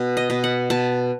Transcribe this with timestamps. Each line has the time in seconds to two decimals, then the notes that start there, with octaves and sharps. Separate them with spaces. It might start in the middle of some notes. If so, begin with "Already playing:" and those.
Already playing: B2
0.17 D#5
0.30 B2
0.44 F#5
0.70 B2 A5